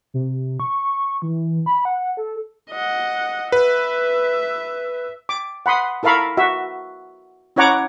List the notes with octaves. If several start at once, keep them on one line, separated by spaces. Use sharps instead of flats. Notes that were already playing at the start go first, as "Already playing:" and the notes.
C3
C#6
E3
B5
F#5
A4
D#5 F#5
B4 E5
D6
F#5 B5 C6 D#6
E4 A4 A#4 F5 B5 C#6
F#4 E5
C#4 E4 C#5 F#5 A#5 D6